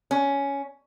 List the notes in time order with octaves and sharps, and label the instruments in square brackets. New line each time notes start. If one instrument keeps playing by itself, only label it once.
[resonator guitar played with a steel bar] C#4